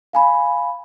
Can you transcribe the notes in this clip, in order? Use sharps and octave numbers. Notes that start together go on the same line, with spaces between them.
F5 G#5 B5